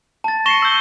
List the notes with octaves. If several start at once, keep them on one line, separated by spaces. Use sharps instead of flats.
A5 A6
C#6 A#6 C7 C#7 E7 G7
E6 G6